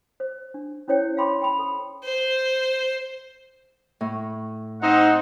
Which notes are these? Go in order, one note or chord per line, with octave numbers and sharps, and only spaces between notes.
C5
D4
C#4 E4 C5 C#5 G5
F5 G5 B5 C6 D6
G5 B5
A4
C5
A2
C4 D#4 F#5